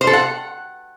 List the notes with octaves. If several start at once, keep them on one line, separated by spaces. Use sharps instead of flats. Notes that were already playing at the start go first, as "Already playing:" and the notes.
C5
A4
F#5